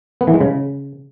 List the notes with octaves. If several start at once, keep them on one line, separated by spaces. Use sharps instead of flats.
B3
E3
G#3
C#3